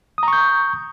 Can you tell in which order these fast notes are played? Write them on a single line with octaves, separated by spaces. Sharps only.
D#6 A#5 C#6 G6